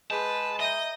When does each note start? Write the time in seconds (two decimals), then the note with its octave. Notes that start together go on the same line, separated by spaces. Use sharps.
0.10 G#3 G#4 B4 A5 G6
0.60 D#5 E5 A#5 D#6 G6